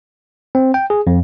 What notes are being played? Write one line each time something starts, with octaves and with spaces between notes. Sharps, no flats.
C4
G5
G#4
F2